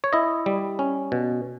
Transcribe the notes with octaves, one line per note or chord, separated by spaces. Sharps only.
C#5
E4 D#5
G3
C#4
B2